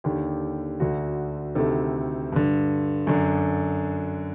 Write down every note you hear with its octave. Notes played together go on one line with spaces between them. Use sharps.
D#2 D3 G4
D2 D3 F#4
D2 C3 D#3 A4
G2 D3
F#2 D3